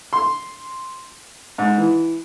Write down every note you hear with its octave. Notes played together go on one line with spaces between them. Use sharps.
C6
G#2
E3